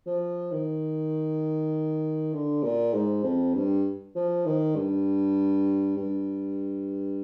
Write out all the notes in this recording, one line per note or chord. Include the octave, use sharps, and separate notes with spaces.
F3
D#3
D3
A#2
G#2
F2
G2
F3
D#3
G2
G2